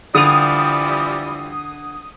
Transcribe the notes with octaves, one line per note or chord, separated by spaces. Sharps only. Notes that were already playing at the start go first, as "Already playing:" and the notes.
D3 E3 F3 G3 D#6 F7